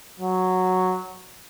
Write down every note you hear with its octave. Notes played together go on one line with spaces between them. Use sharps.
F#3